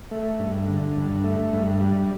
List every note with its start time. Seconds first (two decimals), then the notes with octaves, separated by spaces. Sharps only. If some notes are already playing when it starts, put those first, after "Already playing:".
0.11 A3
0.39 G2
0.68 D3
0.96 G2
1.24 A3
1.53 G2
1.81 G3